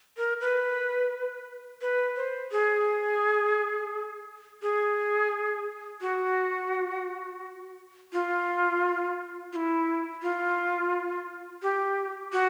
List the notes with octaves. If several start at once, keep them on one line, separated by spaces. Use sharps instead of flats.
A#4
B4
B4
C5
G#4
G#4
F#4
F4
F4
E4
F4
G4
F#4